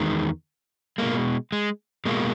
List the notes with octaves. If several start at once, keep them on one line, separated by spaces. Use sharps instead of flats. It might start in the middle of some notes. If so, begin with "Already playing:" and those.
Already playing: E2 D#3 G#3
B2 G#3 A#3
G#3
B2 G#3 A#3